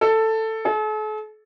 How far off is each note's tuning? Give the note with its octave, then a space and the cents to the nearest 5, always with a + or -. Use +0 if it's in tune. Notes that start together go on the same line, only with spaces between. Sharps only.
A4 +10
A4 -45